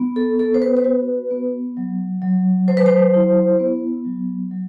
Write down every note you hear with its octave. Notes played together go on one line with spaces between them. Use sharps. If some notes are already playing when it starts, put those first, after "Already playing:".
Already playing: B3
A4
B3 A4
C5
B4
C5
F#4 B4
B3
F#3
F#3
F#3 C5
B4
C5
E4
B3
F#3
F#3